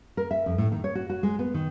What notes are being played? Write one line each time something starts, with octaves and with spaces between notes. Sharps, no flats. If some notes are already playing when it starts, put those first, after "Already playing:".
A#4
E5
F2
A2
D#3
C#5
F#4
F#4
G#3
B3
D#3